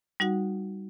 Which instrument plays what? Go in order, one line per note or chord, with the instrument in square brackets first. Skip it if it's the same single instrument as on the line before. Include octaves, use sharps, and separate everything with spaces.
[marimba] G3 D#4 F#4 F#5